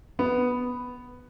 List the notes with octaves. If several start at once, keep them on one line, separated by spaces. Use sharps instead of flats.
B3